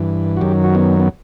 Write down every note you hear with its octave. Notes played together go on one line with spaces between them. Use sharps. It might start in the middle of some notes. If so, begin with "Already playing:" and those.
Already playing: G2 E3
F#4
F#2 D#3 F#3 G4
F#4
B3
B3